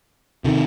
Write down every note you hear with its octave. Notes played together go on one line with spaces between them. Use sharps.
C3 D#3